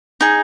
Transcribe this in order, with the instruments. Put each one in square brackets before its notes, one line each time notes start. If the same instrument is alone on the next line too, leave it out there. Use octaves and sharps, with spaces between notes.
[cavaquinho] D#4 G#4